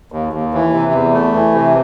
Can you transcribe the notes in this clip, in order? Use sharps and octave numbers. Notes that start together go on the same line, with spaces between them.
D#2
D#2
E3
C3
E2
A3
E3
C3